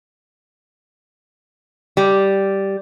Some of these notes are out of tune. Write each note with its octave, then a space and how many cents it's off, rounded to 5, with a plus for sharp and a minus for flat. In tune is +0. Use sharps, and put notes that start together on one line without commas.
G3 -5